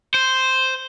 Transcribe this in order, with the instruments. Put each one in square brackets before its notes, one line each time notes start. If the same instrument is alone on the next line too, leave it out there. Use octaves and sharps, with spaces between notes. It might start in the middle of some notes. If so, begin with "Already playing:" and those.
[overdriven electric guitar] C5